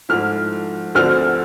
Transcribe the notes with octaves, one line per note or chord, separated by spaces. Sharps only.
G#2 F3 A3 E4 F6
D2 D3 F3 A3 C4 F6